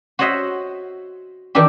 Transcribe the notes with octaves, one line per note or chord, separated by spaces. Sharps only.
F#4 C5 C#5 D#5 E5 F#5
D#3 E3 D4 E4 G4